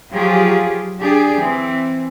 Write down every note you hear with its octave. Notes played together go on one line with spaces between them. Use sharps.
F3 F#3 F4 G4 G#4
D4 G4 G#4
E3 C4